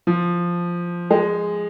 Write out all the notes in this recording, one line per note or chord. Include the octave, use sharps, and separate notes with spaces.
F3
G#3